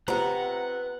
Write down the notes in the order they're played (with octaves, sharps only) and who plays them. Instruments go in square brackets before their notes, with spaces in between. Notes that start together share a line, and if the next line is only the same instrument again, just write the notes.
[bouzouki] C3 A#5 [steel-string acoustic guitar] B3 [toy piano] F4 C5 [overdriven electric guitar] F#5